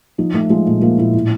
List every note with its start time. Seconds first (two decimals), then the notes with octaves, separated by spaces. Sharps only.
0.18 F3 D#4
0.34 F3 A3
0.50 F3 G#3
0.66 A#2 A3
0.82 F3 A#3
0.99 A#2 E4
1.14 A2